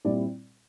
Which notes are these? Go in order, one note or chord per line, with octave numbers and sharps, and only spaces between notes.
A#2 G3 C4 E4 D5